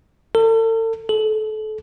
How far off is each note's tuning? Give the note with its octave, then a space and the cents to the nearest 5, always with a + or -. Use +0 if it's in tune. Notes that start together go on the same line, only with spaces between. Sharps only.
A4 +40
A4 -30